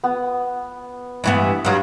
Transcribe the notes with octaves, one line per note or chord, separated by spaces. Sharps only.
B3
G2 E3 B3
G2 F#3 F5